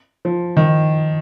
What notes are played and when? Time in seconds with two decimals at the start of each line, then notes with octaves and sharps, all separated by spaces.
0.25 F3
0.57 D#3